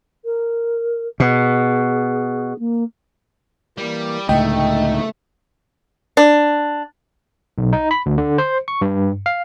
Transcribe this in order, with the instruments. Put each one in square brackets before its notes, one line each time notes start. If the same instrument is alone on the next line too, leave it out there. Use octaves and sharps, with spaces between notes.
[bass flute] A#4
[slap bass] B2 [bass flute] G#4
[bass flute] A#3
[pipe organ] E3 A#3 [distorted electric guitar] G3
[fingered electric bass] C#2 A2 [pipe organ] D3 D#4 [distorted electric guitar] A3 [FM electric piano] D#5 G5
[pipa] D4
[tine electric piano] B1
D#4
B5
D2
D3
C5
C#6
G2
F5